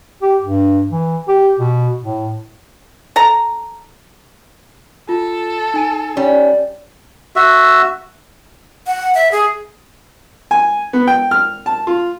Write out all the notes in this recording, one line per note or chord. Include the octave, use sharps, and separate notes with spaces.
G4
G2
E3
G4
B2
A2
A4 A#5
F4 A4
D#4 G#5 D#7
G3 C#4
F#4 E5
F#5
E5
G#4
G#5
B3
G5
F6
A5
F4